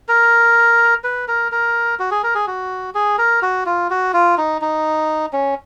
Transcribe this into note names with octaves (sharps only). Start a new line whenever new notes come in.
A#4
B4
A#4
A#4
F#4
G#4
A#4
G#4
F#4
G#4
A#4
F#4
F4
F#4
F4
D#4
D#4
C#4